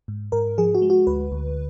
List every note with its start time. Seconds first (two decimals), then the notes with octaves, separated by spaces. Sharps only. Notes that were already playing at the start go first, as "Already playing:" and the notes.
0.08 G#2
0.32 G#2 A#4
0.58 F3 G#4
0.74 F#4
0.82 G#3
0.90 F#4
1.07 D2 B4
1.32 D2